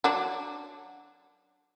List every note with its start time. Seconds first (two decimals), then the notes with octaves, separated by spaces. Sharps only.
0.04 F#3 D4